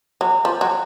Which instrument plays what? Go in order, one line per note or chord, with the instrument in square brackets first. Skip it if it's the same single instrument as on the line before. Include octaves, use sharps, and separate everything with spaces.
[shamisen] F#3
F3
F#3